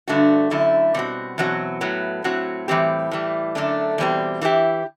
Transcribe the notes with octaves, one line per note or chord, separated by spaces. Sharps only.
G2 D3 A3 D4 F#4
F#2 D3 A3 E4
B2 G3 C4 F#4
E2 B2 F#3 C4 F#4
A2 F#3 B3
A2 F#3 C4 F#4
A2 E3 G3 C4 G4
A2 E3 G3
F#2 D3 A3 D4
E2 B2 G3 C4
E3 A3 C4 E4 G4